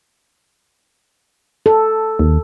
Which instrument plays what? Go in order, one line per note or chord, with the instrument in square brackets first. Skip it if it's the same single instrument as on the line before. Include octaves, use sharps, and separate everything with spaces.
[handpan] A4
[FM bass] D#2